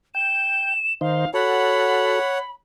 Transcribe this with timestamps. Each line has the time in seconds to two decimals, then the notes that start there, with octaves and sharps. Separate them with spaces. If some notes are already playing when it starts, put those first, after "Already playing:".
0.15 G5 E7
1.01 D#3 D#4 C5 F5
1.34 F#4 A4 C#5 F#5 B5